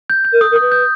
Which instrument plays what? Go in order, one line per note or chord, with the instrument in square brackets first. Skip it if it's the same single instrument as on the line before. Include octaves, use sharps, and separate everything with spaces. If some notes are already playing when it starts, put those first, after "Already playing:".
[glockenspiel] G6
G6
[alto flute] A#4
[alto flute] A4 [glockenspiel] D#6
[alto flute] A#4
[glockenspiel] D#6
[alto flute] B4
[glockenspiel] G6